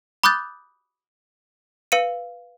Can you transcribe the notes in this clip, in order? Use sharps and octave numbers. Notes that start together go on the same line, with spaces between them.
B5 D6 D#6 F#6 G6 A6
B4 F5 C#7 D#7